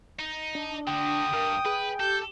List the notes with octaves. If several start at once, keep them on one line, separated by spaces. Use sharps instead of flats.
D#4
D4
D3 F#4 G5 D#6
G2 A#4
G#4 B4
G4 A4 G6